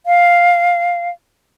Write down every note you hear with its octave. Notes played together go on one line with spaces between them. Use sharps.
F5